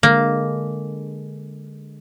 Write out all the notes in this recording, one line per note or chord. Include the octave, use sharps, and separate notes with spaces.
D3 G#3 A#3